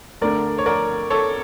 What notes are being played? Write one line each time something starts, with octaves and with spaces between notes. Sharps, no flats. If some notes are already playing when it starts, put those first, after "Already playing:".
D2 D3 A3 D4 A#4 D5
C#5
A#4 D5
A4 C#5